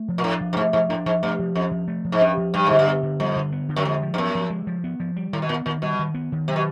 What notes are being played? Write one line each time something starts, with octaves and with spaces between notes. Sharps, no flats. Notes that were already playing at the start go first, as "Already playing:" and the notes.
Already playing: A3
F3
A#2
A2 D4
F3
G2
G#2 A3
G#2 F3
A2 D4
G#2 F3
G2 A3
F3
F2 C#4
F3
A3
F3
G#2
G2 C#4
F3
G2 G3
G#2 D3
G2
B3
D3
F2 G3
D3
B3
D3
F#2
F2 G#3
F3
G2
F#2 B3
F3
G#3
F3
B3
F3
G3
A2 D#3
B2
A#2 B3
A#2 D#3
B2 G3
D#3
B3
D#3
C3 F#3
B2